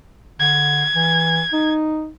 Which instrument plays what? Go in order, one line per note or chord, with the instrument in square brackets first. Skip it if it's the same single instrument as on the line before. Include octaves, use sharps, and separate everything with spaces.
[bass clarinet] D3 [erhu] G#6
[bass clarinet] E3
D#4